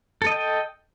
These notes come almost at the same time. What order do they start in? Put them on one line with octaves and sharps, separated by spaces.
A4 D#5 G5